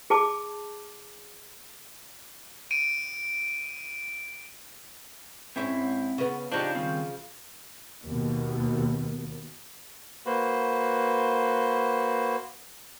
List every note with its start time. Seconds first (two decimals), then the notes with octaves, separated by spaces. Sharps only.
0.10 G#4 A5 D6
2.71 D7 D#7
5.56 G#2 C4 C#4 E4 E5
6.18 C#3 B3
6.52 C#3 F3 D4 D#4 G4
6.75 D#3 G3 C4
8.05 D#2 B2
10.26 A#3 F#4 B4 C5